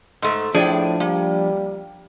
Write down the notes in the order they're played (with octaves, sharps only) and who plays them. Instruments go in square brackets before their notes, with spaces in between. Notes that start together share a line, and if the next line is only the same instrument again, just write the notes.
[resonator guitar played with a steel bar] G#2 A3
[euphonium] A2 [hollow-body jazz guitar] F3 D4 [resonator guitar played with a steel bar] G#4 D5 G5
[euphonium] G3 [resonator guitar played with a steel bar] A#3